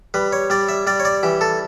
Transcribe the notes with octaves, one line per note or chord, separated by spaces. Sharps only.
G3 B4
C#5
G3 D5
E5
G3 D5
C#5
D5
E3 G4
A4